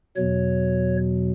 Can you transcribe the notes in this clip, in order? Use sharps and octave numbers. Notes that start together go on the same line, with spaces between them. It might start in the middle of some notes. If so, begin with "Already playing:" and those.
E2 B2 F#3 C#5